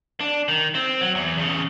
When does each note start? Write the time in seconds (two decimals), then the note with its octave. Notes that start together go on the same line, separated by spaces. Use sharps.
0.20 D4
0.48 D#3
0.75 C4
1.01 F#3
1.15 E2
1.37 E2 C#3